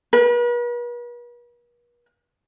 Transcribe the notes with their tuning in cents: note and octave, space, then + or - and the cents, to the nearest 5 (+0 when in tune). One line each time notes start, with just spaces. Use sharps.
B4 -45